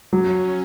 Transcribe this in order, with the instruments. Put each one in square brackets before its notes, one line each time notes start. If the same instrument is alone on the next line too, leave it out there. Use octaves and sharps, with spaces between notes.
[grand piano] F#3 [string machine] C#4